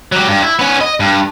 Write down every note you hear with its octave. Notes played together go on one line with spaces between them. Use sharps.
F#3 G4
G2
E4
B3 C#4
D#5
G2